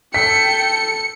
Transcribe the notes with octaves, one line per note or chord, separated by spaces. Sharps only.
A4 G5 B6 C#7